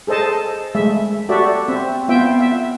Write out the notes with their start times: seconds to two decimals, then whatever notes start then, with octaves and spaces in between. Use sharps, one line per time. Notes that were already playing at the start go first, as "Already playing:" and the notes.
0.07 G#4 A4 C5 D#5 A5
0.75 G#3 A3 E5
1.29 F#4 G4 A4 D5 E5
1.68 C4 E5
2.09 B3 F4 E5 G5
2.40 E5